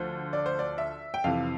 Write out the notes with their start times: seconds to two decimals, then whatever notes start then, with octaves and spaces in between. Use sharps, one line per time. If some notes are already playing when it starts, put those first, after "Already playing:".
Already playing: D2 D3 F3 C5
0.33 D5
0.46 C5
0.59 D5
0.78 E5
1.14 G5
1.24 F2 C3 E3 F5